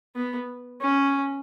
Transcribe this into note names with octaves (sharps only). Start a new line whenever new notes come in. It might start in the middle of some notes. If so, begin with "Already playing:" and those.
B3
C#4